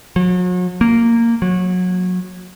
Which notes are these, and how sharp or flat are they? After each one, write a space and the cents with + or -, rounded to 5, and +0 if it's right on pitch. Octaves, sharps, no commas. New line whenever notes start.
F#3 -40
A#3 -10
F#3 -25